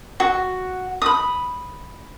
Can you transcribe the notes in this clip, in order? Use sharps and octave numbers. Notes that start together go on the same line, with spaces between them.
F#4
B5 D#6